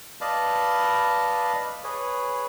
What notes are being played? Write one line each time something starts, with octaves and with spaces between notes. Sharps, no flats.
B4 D5 D#5 F5 A5 B5
G#4 B4 C#5